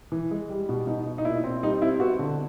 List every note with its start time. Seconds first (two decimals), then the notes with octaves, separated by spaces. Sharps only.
0.12 E3
0.31 G#3
0.50 G3
0.69 B2
0.87 B2 D#4
1.06 B2
1.18 D#4
1.25 A#2 E4
1.44 C4
1.63 G3 D#4
1.82 C4 E4
2.00 B3 F#4
2.19 D3